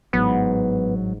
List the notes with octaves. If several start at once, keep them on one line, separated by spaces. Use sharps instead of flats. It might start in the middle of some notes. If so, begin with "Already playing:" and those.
A1 G#2 F#3 B3